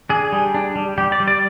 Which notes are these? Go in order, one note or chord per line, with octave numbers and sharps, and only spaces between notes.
D4 G#4
G3
D4
G3
G3 G4
D5
G3
D5